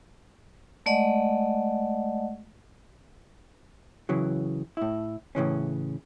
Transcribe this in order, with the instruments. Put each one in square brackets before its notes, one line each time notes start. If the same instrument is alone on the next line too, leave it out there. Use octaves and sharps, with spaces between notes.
[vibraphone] G#3 A3 D5 D#5 F#5
[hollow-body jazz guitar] C#3 E3 F#3
A2 E4
A2 C#3 E3 C#4